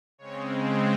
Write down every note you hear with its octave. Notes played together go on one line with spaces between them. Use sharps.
C#3 G#3 C4 C#5